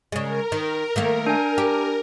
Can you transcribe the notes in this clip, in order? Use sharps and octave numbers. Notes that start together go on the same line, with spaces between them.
C#3 G#3 A#4
D#3
D#3 A3 A#3
D4 G#5
G4